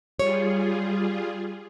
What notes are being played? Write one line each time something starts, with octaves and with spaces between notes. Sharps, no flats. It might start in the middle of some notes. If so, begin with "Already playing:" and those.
G3 F4 G#4 C#5